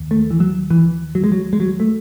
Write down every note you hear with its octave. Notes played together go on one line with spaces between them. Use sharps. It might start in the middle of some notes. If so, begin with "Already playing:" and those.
Already playing: D#2
A3
E3
F#3
E3
F#3
G#3
F#3
G#3
F#3
A3